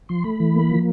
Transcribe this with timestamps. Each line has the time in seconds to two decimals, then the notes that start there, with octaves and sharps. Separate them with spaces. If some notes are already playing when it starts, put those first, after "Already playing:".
0.09 F3 C6
0.24 A3 B5
0.40 E3
0.56 A#3
0.71 F3